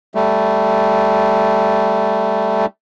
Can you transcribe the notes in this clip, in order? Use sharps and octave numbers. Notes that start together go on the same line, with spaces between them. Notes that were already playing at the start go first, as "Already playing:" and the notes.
G3 A3